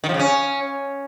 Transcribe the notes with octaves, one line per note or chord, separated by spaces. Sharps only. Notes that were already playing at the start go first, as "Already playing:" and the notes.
D#3
F3
C#3
C#4